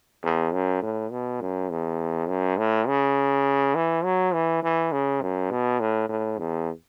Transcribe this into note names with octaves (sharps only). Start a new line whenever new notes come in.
E2
F#2
A2
B2
F#2
E2
F#2
A2
C#3
E3
F#3
E3
E3
C#3
F#2
B2
A2
A2
E2